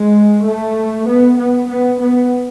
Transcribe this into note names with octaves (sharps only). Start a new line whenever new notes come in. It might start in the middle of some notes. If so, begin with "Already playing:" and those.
Already playing: G#3
A3
B3
B3
B3
B3